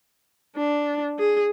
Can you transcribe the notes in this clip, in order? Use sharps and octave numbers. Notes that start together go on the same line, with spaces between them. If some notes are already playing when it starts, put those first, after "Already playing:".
D4
G#4